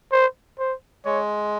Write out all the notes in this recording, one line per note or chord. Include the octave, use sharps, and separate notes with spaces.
C5
C5
G#3 C#5